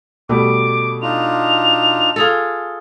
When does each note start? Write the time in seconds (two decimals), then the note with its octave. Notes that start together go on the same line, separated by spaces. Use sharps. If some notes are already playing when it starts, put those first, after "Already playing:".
0.29 B2 G3 A3 D6
1.02 D4 D#4 F4 F7
2.16 F4 G#4 A4